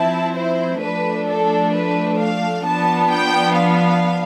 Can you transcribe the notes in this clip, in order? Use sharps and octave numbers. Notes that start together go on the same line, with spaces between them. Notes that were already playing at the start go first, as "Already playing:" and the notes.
Already playing: F3 C4 E4 A5
C5
F3 A3 D4 B4
A4
B4
F5
F3 B3 D4 A5
G5
F5